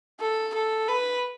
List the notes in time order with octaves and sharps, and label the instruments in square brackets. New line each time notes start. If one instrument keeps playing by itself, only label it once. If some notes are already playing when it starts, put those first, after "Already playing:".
[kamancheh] A4
A4
B4